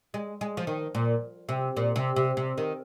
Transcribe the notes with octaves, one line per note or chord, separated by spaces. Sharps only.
G#3
G#3
F3
D#3
A#2
C3
A#2
C3
C3
C3
D#3